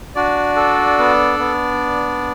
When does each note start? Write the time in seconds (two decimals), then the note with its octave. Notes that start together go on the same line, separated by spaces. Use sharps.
0.15 D4 F#4 D5
0.56 A4
0.98 B3
1.39 B3